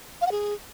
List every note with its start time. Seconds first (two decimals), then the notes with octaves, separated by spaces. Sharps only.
0.21 F5
0.26 F#5
0.32 G#4